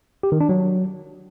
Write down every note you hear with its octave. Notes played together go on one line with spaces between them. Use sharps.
G4
D#3
D4
F#3